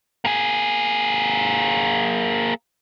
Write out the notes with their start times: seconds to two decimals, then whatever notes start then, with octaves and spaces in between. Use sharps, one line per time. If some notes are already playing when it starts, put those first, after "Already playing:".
0.25 A#3 G#4